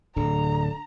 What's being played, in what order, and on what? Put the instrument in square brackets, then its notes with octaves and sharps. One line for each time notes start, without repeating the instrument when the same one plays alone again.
[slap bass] D1 [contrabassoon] D3 [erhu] A#5